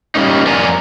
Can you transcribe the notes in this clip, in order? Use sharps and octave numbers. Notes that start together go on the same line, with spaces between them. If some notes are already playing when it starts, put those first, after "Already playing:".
G3 A#3 C#4 D#4
F2 A#4 D5 F#5 G#5 A#5